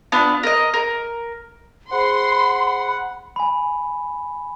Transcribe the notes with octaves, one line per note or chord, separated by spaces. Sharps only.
B3 D4 F4 A5
A#4 D#5
A#4
G#4 C5 F#5 B5 C6
G#5 B5